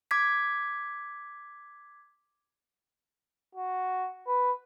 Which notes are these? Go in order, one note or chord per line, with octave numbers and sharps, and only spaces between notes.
D6 G#6 B6
F#4
B4